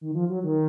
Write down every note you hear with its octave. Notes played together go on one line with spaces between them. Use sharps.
D#3
F3
F#3
D#3